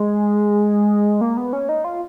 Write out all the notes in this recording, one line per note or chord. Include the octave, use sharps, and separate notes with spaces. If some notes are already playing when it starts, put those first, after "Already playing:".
Already playing: G#3
A#3
B3
C#4
D#4
F4